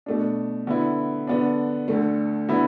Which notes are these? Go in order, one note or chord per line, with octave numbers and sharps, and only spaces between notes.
B2 A3 D4
D3 B3 E4
D3 B3 D4
D2 D3 A3
D3 B3 E4